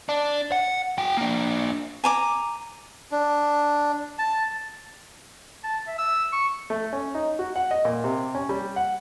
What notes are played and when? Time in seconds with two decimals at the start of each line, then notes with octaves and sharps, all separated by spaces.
0.09 D4
0.52 F#5
0.98 F#4 G5
1.17 A#3 D4
2.04 G#5 A#5 D6
3.12 D4
4.19 A5
5.64 A5
5.87 E5
5.99 E6
6.32 C#6
6.70 A3
6.93 C#4
7.15 D#4
7.39 F#4
7.56 F#5
7.71 D#5
7.85 A#2
8.04 C3
8.35 C#4
8.49 G3
8.76 F#5